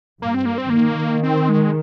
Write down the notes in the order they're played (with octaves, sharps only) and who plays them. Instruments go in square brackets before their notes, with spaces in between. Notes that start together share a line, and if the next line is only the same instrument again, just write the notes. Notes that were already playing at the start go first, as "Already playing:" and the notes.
[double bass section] G2 [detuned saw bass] A#3
[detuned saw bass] C4
A#3
C4
[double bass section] D#3 [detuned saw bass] A#3
[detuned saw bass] C4
G#3